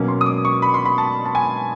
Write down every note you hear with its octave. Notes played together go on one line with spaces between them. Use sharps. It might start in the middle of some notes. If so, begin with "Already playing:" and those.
Already playing: B2 F#3 A#3 C#4
C6
D#6
D6
C#6
B5
C6
B5
A5
A5
G#5